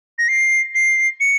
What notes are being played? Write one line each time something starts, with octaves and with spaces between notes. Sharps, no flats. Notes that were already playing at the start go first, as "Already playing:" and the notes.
A#6
C7
C7
C#7